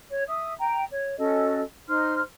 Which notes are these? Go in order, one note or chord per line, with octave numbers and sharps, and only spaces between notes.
C#5
E5 D#6
G5 A#5
C#5
C#4 F#4 A4 D#5
D#4 C5 C6 F6